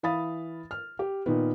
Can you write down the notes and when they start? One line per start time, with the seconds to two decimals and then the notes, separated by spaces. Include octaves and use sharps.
0.03 E3 F5 B5 D#6 A6
0.71 F6
0.99 G4
1.26 A#2 D#3 B3